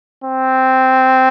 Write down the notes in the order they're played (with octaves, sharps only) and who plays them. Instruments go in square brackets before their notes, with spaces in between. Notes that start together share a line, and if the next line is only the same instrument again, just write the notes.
[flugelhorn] C4